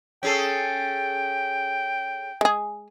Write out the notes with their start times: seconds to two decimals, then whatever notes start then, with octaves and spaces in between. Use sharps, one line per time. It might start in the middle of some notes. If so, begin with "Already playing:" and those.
0.23 C#4 G#4 A4 G5
2.41 G#3 G#4